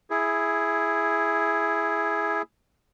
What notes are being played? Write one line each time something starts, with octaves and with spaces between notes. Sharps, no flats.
E4 G#4